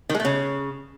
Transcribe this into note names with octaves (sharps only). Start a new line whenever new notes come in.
D#3
G#3
A3
C#3